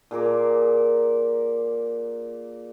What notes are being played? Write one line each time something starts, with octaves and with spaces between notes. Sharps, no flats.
A#2 G#4 A#4 D6